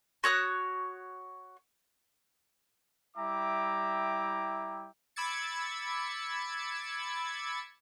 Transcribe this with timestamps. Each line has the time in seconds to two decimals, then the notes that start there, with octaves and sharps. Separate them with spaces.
0.24 F#4 C#5 D#6 F#6
3.17 G3 E4 E5 G5 A#5 D6
5.16 B5 D6 E6 G#6 A6 C#7